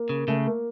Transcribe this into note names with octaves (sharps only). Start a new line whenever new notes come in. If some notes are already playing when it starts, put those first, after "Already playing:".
Already playing: A#3
C#3
C#3 A3
A#3